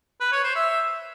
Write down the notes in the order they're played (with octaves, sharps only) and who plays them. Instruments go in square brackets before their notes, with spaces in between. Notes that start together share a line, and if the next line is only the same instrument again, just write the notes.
[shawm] B4
C#5
C5
E5